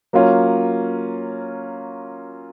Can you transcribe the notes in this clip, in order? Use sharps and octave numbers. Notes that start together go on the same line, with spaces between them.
F#3 A#3 C#4 F4